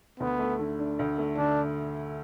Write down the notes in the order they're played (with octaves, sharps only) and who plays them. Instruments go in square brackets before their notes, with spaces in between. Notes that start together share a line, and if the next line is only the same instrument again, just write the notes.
[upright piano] D2 [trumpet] B3
[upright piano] A3
D3
D4
D2
A3
[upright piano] D3 [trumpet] D4